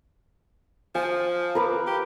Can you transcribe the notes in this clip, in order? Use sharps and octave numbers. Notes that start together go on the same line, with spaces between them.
F3 G#5
A#4 B4 D6
G4